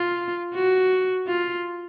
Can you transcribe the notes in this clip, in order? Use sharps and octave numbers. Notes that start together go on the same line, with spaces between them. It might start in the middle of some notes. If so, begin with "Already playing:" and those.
Already playing: F4
F#4
F4